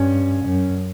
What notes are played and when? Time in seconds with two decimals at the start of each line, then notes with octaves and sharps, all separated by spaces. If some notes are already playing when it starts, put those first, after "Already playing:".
Already playing: G2 C#4
0.45 F#2